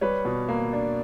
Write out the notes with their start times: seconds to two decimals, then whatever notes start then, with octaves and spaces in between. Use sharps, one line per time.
0.01 G3 B4 C#5
0.25 B2
0.48 A#3
0.73 D4